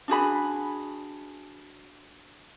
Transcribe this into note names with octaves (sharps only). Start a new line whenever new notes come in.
D4 F#4 G#4 B5